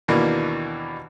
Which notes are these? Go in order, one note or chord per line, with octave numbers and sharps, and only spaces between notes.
D#2 B2 E3 A#3 D4